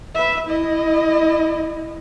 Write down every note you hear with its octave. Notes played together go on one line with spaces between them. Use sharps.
B4 E5
E4 D#5